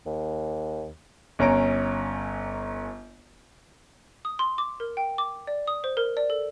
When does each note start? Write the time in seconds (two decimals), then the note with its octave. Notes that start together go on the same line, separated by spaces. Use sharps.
0.06 D#2
1.39 G1 C#4 A#5 D7
4.25 D#6
4.39 C6
4.58 D6
4.80 A#4
4.97 G5
5.18 D6
5.47 D5
5.67 D#6
5.84 C5
5.97 A#4
6.17 D5
6.30 A4